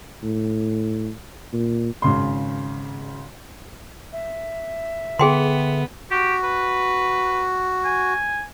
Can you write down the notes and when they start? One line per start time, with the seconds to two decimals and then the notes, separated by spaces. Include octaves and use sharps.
0.23 A2
1.53 A#2
2.02 G#1 C#3 C6
4.13 E5
5.19 D3 B3 G#4 G5 C6
6.11 F#4 G4
6.43 B4
7.85 G#5